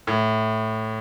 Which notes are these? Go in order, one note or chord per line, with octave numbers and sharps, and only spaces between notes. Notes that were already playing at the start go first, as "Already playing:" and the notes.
A2